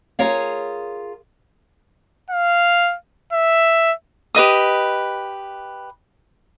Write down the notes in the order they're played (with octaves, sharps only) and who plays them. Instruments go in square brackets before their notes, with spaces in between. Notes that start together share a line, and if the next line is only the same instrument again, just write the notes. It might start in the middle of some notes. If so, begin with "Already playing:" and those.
[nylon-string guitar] F4 G#4 A#4 C#5 F5
[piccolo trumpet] F5
E5
[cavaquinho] G4 B4 D#5 D#6